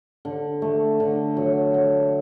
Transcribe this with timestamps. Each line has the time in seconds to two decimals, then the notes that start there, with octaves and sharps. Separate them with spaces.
0.25 D3
0.62 A3
1.00 D3
1.37 F#3
1.74 A3